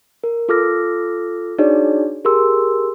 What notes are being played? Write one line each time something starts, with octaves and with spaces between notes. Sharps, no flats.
A#4
F4 A4 D6 E6 F6 A#6
D4 D#4 F#4 G#4 C#5 D5
G4 G#4 A#4 C6 E6